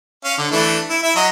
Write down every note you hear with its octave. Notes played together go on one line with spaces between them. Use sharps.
C#4 F5
D3
E3 A3 D4
E4
E4 E5
F#3 D#5